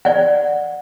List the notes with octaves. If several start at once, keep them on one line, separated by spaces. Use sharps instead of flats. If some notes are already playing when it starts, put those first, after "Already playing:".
D5 F#5